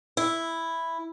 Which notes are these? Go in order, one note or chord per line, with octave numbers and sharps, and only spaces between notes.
E4